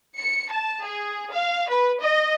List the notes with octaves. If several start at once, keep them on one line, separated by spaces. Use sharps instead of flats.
C#7
A5
G#4
F5
B4
D#5